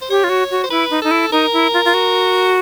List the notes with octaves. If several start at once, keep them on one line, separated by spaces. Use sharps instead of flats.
C5
G4 C#5
F4
F#4
F#4
C5
E4 B4
D#4
D#4 A4
E4
D#4 A#4
E4
F4
F4
F#4